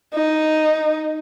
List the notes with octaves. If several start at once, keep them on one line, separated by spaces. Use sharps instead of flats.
D#4